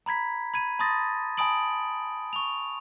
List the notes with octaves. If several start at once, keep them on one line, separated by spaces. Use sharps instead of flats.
A#5 B5 G#6 B6
B5 G#6 D#7
A5 B5 C6 D#6 A6 A#6
G#5 A5 B5 D#6 D7 F#7
C#6 F7